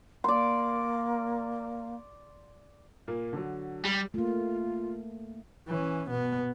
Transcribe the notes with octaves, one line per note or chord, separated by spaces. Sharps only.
A#3 D5 C6
A#2 A#3
D3 F#3
G3
A3 A#3 F4
E3 C#4
B2 B3